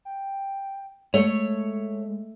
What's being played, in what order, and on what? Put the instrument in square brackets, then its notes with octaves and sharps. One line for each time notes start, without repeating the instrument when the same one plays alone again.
[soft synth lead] G5
[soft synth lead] G#3 [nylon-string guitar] A3 [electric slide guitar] C#5